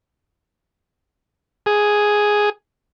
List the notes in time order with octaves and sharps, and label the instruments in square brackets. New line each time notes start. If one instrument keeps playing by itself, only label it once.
[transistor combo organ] G#4